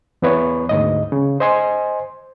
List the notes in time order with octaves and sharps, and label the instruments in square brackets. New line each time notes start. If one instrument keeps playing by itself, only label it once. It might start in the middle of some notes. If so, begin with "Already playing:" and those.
[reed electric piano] E2 E3 B3 B4 C#5
D2 G#2 D#5
C#3
C5 D#5 G#5 C6